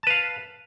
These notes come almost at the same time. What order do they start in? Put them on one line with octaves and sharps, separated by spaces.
A5 B4 F5